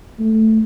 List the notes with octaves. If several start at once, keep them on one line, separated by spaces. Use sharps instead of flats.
A3